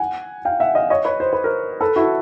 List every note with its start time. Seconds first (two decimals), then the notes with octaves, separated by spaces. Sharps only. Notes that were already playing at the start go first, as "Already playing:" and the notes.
Already playing: F#5 G#5
0.45 F5 G5
0.60 E5 F#5
0.75 D#5 F5
0.90 C#5 D#5
1.05 B4 C#5
1.20 C5
1.33 B4
1.44 A#4 C5
1.81 A4 B4
1.96 E4 F#4